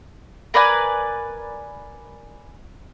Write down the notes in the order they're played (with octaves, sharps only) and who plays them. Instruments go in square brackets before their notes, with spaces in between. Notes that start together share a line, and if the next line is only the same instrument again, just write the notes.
[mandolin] A#4 B4 D5 G#5